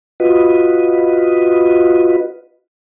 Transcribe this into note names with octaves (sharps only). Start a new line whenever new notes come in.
F4 F#4 B4 D#5